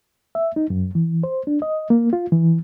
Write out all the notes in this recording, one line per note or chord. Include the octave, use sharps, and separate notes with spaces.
E5
D#4
F#2
E3
C5
D4
D#5
A#3
F4
E3